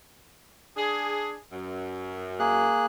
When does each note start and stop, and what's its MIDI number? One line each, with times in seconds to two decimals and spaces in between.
0.77 1.35 62
0.77 1.35 68
1.52 2.70 42
2.40 2.86 58
2.40 2.86 68
2.40 2.86 90